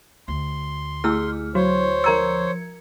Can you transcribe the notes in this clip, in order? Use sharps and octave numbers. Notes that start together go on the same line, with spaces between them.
D2 C6
A3 E4 G#4 E6 F6
F#3 F#4 C5 C#5
F3 A#4 A#5 E6 G#6 C#7